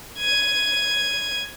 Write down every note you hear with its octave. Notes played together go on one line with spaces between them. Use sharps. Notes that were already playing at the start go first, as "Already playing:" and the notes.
G#6 D#7